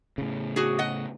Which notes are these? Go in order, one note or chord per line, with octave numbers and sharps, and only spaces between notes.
A2 C#3
F#4 G#4
D#5 F#5